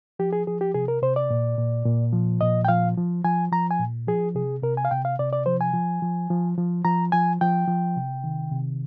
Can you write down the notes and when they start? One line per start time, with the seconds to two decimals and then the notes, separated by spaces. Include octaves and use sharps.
0.19 F3 G4
0.33 G#4
0.47 F3 G#4
0.61 G4
0.74 C3 G#4
0.88 A#4
1.02 C3 C5
1.16 D5
1.30 A#2
1.58 A#2
1.86 A#2
2.13 F3
2.41 A#2 D#5
2.65 G5
2.68 F3 F5
2.97 F3
3.24 F3 G#5
3.52 F3 A#5
3.71 G#5
3.79 A#2
4.07 F3 G#4
4.35 C3 G#4
4.63 C3 A#4
4.77 G#5
4.85 F5
4.91 C3 G5
5.05 F5
5.19 C3 D5
5.33 D5
5.46 F3 C5
5.61 G#5
5.74 F3
6.02 F3
6.30 F3
6.58 F3
6.85 F3 A#5
7.12 F3 G#5
7.41 F3 G5
7.68 F3
7.96 C3
8.24 D#3
8.52 C3